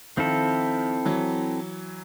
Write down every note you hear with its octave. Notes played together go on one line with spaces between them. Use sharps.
D#3 F3 C4 E4 A4
E3 F#3